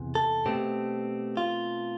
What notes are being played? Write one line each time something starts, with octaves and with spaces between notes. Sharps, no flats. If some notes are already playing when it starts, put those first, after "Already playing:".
Already playing: E2 C3 E3
A4
B2 A3 C4 G4
F4